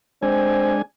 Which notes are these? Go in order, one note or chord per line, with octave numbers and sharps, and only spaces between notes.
G#3 C4 D4 G#5